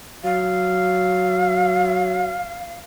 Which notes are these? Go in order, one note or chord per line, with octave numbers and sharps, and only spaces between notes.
F#3 F5